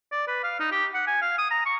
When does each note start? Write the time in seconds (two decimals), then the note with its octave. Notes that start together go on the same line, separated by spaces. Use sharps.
0.12 D5
0.28 B4
0.44 F5
0.60 D#4
0.72 G4
0.95 F#5
1.07 G#5
1.22 F5
1.38 D#6
1.51 A#5
1.66 C#6